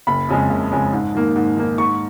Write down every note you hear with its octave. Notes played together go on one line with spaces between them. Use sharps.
F#1 B5
F2 C#3 G#3
F#1
F2 C#3 G#3
G#2
D#3 A#3
G#2
D#3 A#3
G#2 C#6